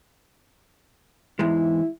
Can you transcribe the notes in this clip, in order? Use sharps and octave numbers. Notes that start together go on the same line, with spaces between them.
E2 G#2 G#3 E4